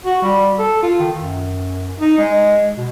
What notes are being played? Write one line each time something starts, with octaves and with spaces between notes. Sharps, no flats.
F#4
G3
A4
F4
D#3
F#2
D#4
G#3
B2